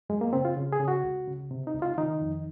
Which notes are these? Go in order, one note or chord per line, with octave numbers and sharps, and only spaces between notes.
F#2 G#3
A#3
C#3 C4
F4
C#3
G#4
C#3
F#4
C#2
C#3
C3
D#4
C#2
F4
D#3 D#4
F2